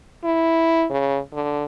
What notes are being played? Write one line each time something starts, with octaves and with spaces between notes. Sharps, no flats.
E4
C#3
D3